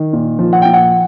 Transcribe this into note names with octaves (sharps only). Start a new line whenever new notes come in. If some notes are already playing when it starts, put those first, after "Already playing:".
Already playing: D#3
A#2
F3
F#5
A#2 G5
F#5